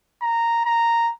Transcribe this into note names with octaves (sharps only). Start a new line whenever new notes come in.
A#5
A#5